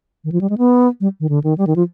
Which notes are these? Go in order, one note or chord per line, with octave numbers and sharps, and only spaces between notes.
D#3
F3
G3
G#3
B3
G3
D#3
D3
D#3
G3
D#3
F3